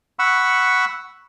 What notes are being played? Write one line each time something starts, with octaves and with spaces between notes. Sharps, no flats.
F#5 B5 C#6 E6